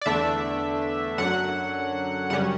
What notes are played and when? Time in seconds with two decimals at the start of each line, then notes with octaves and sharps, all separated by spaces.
0.01 D5
0.06 E2 D3 A3 D4 E5
1.18 F#2 D3 F#3 F#5
2.30 F#2 C#3 G3 C#4 F#5